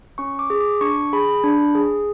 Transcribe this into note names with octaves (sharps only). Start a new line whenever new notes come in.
C#4 C#6
D6
G#4
D6
D4 C#6
G#4 B5
D4
G#4